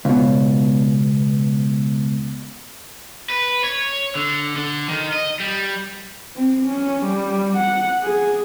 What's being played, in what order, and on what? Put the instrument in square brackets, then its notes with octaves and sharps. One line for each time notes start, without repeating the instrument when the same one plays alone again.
[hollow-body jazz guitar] C#2 B2
[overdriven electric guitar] B4
C#5
D3
D3
D#3
D#5
G3
[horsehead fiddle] C4
C#4
G3
F#5
G#4